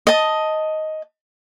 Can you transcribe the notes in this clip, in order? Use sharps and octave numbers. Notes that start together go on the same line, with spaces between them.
D#5 A5